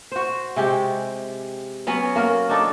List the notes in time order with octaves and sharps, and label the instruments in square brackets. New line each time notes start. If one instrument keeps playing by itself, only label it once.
[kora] F#4 C5
C3 G#3 G4
F#3 B3 C#4
A#3 F#4 A#4
D4 D#4 A4 D5